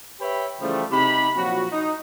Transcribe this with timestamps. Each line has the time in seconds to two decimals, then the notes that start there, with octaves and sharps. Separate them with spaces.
0.20 G4 B4 C#5 E5 G5 B5
0.61 C#3 E3 F3 G3 A3
0.91 C3 D#4 G4 B5
1.36 A#2 F3 F#3 F#4
1.72 D#4